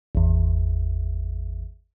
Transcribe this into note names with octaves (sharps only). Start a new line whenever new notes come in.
G#1 E2